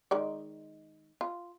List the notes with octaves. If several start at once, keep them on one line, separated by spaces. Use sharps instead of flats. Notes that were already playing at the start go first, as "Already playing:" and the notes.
D#3 G#3 D5
F4